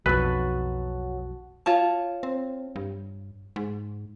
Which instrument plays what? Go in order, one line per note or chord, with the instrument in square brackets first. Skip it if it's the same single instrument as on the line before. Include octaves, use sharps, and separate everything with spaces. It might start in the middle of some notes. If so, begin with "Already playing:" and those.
[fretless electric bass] B1 F2 [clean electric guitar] F#3 [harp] F#4 A5 [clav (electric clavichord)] B4
[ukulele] F4 C#5 A5
[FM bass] C4
G2
G#2